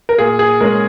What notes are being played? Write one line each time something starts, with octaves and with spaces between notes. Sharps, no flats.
A#4
A#2 G#4
G#4
G#3 C#4 A#4